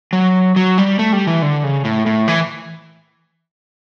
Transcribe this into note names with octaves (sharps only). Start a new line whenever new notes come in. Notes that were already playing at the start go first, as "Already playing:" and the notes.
F#3
F#3
G3
A3
G3
E3
D3
C#3
A2
A2
E3